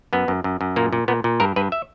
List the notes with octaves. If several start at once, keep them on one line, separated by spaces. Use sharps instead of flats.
F#2 B3
F#2
F#2
F#2
A#2 A#3
A#2
A#2 B3
A#2
G2 A#4
G2 B4
E5